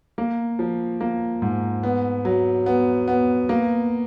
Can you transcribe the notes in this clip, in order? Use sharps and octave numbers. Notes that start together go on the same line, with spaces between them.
A#3
F3
A#3
G#2
B3
F#3
B3
B3
A#3